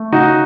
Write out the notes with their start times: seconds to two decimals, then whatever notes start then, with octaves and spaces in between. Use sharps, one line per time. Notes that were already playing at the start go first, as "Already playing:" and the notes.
Already playing: A3
0.12 C#3 D#4 F#4